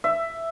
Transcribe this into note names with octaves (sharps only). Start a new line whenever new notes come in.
E5